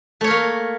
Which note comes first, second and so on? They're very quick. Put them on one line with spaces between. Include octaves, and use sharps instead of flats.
A3 C#5 A#4 A#3